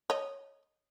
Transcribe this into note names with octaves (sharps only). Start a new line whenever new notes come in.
C#5 D#5